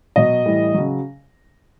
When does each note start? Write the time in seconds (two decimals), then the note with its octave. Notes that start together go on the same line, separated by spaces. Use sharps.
0.16 B2 F#3 D#5
0.46 A2 E3 G3
0.74 C#3 F#3